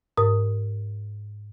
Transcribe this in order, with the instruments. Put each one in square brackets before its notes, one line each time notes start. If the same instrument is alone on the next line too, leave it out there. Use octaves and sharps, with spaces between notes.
[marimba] G#2 A#4 D#6